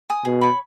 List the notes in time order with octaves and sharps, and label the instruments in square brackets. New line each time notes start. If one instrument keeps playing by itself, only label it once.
[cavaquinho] G#5 D#6
[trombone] B2 [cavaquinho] G#4
[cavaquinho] C#5 B5